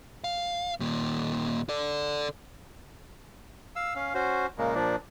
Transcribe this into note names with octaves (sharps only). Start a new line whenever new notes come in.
F5
D#2 A#2
A4 D5
F5 E6
C#4 F5
C#4 F#4 C5
A#2 C#3 G#3 A#3
A#2 F3 D4